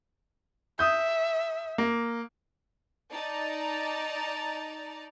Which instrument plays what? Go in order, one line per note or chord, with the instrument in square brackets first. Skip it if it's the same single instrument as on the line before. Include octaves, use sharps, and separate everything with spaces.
[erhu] E5 [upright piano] D#6 G6
[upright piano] A#3
[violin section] D#4 D5 A5 A#5